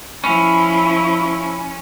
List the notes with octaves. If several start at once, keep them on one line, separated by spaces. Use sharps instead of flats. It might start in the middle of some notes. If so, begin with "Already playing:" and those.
F3 C#4 E4 B5